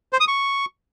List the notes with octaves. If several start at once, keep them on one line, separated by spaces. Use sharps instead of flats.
C5
D#6
C#6